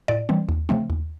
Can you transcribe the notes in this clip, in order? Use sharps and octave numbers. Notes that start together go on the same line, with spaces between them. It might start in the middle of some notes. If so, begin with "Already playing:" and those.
A2 D5
E3 G3 C4
D#2
C#3 F3 A3 C4
D#2